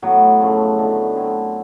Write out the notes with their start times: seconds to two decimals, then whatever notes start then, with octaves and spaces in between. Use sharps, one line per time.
0.02 A2 F#3 B3
0.40 F#2 C#3 F3 A3
0.78 D3 F#3 B3 D#4
1.16 F#3 A3 C4 E4